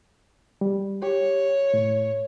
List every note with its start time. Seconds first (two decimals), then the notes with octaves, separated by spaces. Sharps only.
0.61 G3
1.03 G4 C#5
1.74 A2